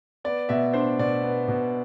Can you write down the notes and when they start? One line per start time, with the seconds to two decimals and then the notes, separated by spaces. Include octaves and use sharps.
0.24 B3 D5
0.49 B2 E5
0.74 D4 C5
0.99 B2 D5
1.23 B3
1.48 B2